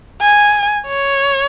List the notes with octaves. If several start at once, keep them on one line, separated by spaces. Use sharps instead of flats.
G#5
C#5